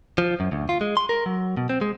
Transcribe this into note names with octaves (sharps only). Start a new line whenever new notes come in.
F3
F#2
D2
F4
G#3
C6
A#4
F#3
B2
C4
G#3